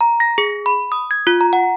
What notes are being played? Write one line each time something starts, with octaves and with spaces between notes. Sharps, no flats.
A#5
A#6
G#4
B5
D#6
G#6
F4
A#5
F#5